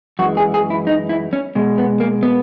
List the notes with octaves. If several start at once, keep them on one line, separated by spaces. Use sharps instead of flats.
F#2 E3 G#3 F#4
G#4
G#4
E4
D#4
E4
C#4
B2 G#3
B3
A#3
B3